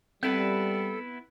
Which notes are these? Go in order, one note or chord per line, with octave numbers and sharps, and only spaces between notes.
G3 B3 C4 E4 A4 B4